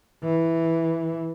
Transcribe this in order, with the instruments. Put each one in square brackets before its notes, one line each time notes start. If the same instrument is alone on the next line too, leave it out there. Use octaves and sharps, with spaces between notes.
[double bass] E3